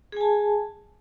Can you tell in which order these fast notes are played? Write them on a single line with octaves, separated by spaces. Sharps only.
G#4 G#5 A5